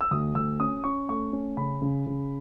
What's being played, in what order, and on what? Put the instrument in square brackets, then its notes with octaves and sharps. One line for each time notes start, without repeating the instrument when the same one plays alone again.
[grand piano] E6
D2 D#6
D2 E6
C#4 D#6
C#4 C#6
A3 C#6
C#4
C#3 B5
C#3
C#3